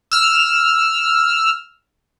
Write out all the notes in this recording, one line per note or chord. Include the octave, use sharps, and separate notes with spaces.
E6 F6